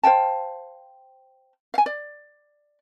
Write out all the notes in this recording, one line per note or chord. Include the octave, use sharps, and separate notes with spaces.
C5 F5 G5 A5
F5 G#5
D5